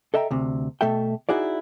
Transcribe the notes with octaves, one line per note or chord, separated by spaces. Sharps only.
A4 D#5 E5 G5 A#5
D2 C3
B2 A3 A4 E5 G5
D#4 E4 F#4 G#4 D5